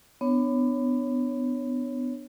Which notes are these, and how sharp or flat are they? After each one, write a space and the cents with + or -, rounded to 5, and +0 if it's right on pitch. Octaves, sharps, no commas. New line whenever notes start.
B3 +20 D4 +20 C#5 +0